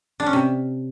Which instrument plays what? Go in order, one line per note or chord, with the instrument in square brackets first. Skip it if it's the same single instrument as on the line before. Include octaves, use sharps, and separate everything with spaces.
[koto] D4
C#4
C3